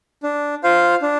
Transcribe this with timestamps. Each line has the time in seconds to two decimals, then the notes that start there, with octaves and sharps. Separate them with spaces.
0.23 D4
0.64 F4 C5 F5
1.02 D4